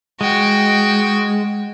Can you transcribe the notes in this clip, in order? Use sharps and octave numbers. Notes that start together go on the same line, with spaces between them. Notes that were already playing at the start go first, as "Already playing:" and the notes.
G#3 F#4 G5